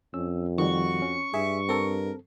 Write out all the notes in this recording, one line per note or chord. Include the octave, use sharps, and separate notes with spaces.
F2 C#4 E6
D#3 F3 G3 F#4 C#6
C#4
G2 G#4 E5
C4 A4 A#4